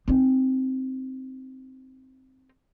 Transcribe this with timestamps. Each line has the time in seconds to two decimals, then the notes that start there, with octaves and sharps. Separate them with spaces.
0.08 C4 D#4